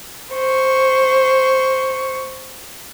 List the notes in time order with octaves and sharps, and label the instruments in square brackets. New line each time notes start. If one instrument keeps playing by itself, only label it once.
[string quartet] C5 C#6